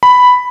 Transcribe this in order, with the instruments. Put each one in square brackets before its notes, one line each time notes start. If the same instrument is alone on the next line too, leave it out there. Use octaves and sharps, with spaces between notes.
[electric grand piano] B5